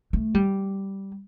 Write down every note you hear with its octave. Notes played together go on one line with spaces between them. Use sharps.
A3
G3